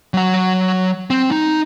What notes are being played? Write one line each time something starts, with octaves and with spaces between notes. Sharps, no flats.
F#3 F#5
C4
D#4